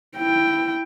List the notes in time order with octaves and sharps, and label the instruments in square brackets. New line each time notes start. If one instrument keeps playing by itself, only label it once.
[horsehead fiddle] E4 G5